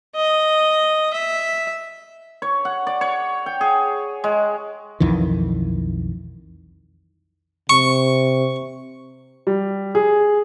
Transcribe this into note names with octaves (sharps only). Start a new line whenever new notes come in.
D#5
E5
C#5
F#5
D5
C#5
G5
G#4
G#3
B1 F2 D#3 E3
C3 C#6
G3
G#4